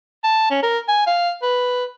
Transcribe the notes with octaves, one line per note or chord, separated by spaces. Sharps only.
A5
C#4
A#4
G#5
F5
B4